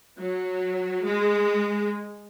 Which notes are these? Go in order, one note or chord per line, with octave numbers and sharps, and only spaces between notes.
F#3
G#3